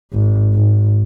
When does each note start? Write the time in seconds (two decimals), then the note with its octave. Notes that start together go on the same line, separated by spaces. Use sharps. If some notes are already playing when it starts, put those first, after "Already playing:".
0.13 G#1
0.54 G#1